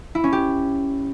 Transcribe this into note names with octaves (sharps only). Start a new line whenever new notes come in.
E4
C#4
G4